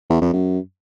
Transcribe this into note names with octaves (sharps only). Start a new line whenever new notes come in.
E2
F2
F#2